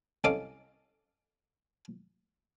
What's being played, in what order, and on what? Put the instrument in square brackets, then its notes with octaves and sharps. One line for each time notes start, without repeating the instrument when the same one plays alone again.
[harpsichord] C2 C#4 A4 D#5 F5 D6